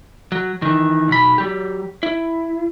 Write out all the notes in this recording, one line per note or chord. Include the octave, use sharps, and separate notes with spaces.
F#3
D#3 E3
B1 B5
F#3 G4
E4